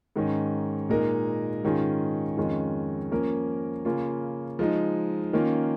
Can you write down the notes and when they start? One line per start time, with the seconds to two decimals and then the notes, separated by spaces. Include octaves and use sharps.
0.16 G#2 D#3 C#4
0.89 A#2 G#3 D#4 A#4
1.63 G#2 D#3 C#4 F4 G#4
2.37 F2 D#3 G#3 C#4 F4
3.11 F3 A#3 C#4 A#4
3.85 C#3 A#3 C#4 F4
4.59 F3 G#3 D#4
5.33 D#3 A#3 C#4 F4